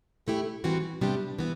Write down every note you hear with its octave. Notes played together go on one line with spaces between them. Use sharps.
E3 A3 E4 G4
E3 G3 C4 F#4
C3 G3 B3 D4 G4
E3 B3